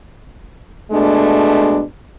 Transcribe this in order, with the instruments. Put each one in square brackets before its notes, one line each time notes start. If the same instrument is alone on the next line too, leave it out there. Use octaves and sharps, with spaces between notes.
[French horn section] B2 G#3 A3 D4